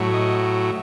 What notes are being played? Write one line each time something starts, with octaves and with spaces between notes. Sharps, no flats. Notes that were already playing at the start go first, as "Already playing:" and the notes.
Already playing: A2 F#3
D#5